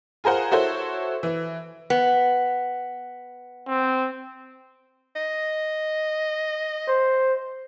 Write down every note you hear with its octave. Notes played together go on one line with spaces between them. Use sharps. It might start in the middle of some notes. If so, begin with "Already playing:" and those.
F4 G#4 A#4 C5 F#5
E4 F#4 A4 C5 C#5
E3
B3
C4
D#5
C5